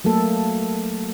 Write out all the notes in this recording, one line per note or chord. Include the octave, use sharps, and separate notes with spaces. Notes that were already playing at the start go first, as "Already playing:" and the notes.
F#3 A3 A#3 A4